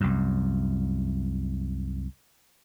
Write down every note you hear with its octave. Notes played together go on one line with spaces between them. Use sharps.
C2 F#2